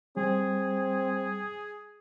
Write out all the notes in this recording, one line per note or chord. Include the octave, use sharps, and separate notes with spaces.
G3 C4 G#4